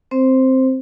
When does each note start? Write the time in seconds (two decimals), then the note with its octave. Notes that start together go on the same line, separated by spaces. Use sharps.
0.11 C4 C5